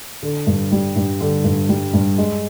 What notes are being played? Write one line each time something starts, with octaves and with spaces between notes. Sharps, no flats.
D3
G2
G3
G2
D3
G2
G3
G2
G#3